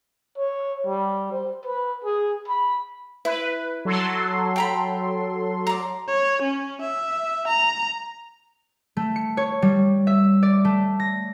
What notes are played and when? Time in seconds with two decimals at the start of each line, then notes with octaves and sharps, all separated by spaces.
0.38 C#5
0.86 G3
1.31 C5
1.65 B4
2.05 G#4
2.48 B5
3.25 E4 B4
3.85 F#3 A4 C6
4.56 G5 A#5 B5
5.67 D5 A#5
6.08 C#5
6.42 C#4
6.81 E5
7.48 A#5
8.97 A3
9.16 C#7
9.37 C#5
9.62 G3
10.07 E5
10.43 D5
10.65 A3
11.00 A#6